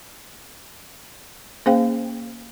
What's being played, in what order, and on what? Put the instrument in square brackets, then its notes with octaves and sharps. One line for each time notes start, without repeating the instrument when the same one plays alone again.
[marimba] A#3 C#4 G#4 C5 F5 G5